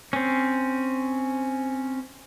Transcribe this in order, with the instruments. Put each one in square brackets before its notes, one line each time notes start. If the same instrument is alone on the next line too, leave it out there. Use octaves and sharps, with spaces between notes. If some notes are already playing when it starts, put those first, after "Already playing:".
[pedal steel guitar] C4 C#4